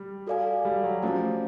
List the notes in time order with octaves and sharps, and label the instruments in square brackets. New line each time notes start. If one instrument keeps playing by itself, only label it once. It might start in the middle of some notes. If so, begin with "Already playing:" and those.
Already playing: [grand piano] G3
[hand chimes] F#4 A4 D5 F5 G#5
[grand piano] G3
F#3
[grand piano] F3 [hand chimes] A3 C#4 F#4